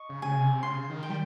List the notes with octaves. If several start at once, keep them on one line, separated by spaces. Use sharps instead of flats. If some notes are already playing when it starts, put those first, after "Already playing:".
Already playing: D#5 C#6
C#3
C#3 G#5
C3
C#3 C6
D#3
G5
G3